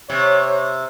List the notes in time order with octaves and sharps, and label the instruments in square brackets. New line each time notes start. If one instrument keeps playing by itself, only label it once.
[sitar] C3 [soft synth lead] C#5